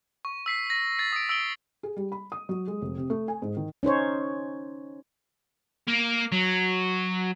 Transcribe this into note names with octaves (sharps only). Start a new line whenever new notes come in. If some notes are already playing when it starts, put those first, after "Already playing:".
C#6
E6 B6 C7
A#6
A6 C7
D#6 D7
E6 D7 G7
G#4
G3
B5
D#6
F#3
G#3
F1
C3
A3
G#5
G#2
D#3
C#4 D#4 C5 C#5
A#3
F#3